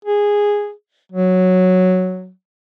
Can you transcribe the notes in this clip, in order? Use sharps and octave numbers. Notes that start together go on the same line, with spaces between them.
G#4
F#3